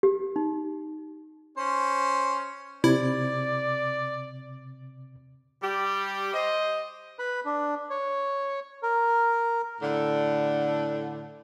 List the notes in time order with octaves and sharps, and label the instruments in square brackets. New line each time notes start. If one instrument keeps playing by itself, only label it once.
[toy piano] G4
D#4
[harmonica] C#4 C5
[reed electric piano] C3 G#6 [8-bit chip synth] E4 [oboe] D5
[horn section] G3 G4
C5 D#5
[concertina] B4 B5
D4
C#5
A#4
[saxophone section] A2 D3